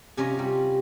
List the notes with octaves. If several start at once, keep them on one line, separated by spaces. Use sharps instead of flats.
C3 C#4 F4 C#5 D#5
G3